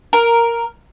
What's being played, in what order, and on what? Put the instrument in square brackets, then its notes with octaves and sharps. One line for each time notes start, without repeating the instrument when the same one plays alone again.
[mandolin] A#4